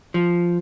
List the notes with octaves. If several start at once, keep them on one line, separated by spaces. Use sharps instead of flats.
F3